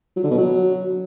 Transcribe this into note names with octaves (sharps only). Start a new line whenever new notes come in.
F#3
D3
B2
F#3